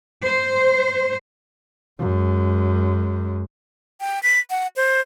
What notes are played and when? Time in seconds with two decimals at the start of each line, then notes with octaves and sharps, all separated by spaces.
0.25 C5
2.00 F#2 G#3
4.01 G5
4.23 B6
4.50 F#5
4.76 C5